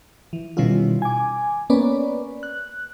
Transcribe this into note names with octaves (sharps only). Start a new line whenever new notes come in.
E3
B2 D#3 G3 C#4 E4 F4
G#5 D6
A#3 B3 C#4 B4 D5
F#6